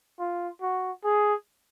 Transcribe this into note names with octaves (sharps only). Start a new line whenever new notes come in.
F4
F#4
G#4